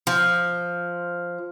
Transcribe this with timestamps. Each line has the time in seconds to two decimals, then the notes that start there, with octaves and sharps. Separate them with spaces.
0.07 F3